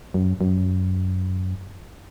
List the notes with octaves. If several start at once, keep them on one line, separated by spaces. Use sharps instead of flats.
F#2
F#2